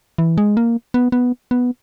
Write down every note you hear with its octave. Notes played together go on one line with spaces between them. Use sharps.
E3
G#3
A#3
B3
B3
B3